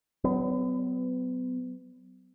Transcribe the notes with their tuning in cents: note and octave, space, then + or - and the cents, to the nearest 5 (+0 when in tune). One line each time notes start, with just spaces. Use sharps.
F#3 +20 B3 +35